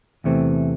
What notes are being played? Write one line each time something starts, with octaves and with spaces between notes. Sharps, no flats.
E2 C3 E3 A3 C4